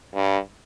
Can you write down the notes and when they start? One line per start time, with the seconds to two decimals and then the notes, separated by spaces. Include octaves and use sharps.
0.15 G2